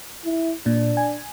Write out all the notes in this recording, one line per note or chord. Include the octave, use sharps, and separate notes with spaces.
E4
A#2 D4
G#5